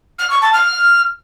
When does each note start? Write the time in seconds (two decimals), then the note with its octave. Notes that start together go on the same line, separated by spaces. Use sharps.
0.19 F6
0.30 C#6
0.42 A5
0.53 F6